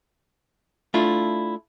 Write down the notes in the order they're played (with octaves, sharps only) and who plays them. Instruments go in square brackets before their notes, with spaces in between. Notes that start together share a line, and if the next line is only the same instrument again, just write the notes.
[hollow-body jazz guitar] A3 D4 E4 F4